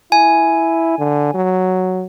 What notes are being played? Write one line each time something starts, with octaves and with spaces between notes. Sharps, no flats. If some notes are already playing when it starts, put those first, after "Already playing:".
E4 G#5
D3
F#3